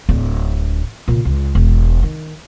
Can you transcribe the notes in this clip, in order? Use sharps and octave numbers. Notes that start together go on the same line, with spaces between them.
D1 D4
A#2 C#3
C#2
E1
D#3